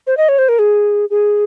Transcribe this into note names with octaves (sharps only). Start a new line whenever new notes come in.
C5
D#5
C#5
C5
A#4
G#4
G#4